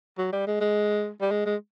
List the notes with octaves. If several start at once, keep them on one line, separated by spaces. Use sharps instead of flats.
F#3
G3
G#3
G#3
G3
G#3
G#3